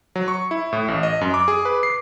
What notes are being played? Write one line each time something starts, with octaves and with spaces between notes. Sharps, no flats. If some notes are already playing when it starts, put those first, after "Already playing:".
F#3
C#6
E4
A2
A1
D#5
F#2
D6
G#4
B4
C7